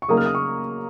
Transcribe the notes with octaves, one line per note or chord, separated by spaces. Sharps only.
C#6
C#3 F#3 A#3 D#4 A#4 D#6
F6
D#6
C#6